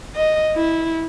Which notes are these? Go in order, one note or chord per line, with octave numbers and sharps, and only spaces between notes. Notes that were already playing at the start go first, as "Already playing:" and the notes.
D#5
E4